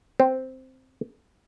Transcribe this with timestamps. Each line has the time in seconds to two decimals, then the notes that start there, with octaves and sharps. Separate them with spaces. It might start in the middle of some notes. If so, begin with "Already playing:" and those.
0.20 C4